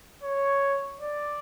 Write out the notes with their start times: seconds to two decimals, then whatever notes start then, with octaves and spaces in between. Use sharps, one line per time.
0.23 C#5
1.00 D5